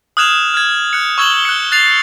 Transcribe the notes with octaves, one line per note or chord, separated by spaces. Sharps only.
D#6 F6 F#6 G#6 E7 F7
F6 G#6
F#6 C#7
C#6 E6 G#6 E7 F#7 G7
F#6 C#7
F#6 A6 C7 F7